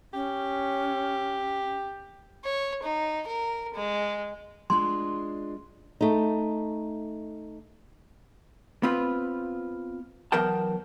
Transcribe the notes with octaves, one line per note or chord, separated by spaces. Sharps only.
C#4 G4
C#5
D#4
A#4
G#3
G#3 D4 F4 C6
A3 D#4
B3 C4 F4 B4
E3 F#3 B3 A#4 G5 A5